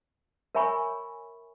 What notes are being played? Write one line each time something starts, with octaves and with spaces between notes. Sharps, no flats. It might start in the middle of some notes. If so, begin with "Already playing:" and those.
A#4 C#5 E5 G#5 B5 C#6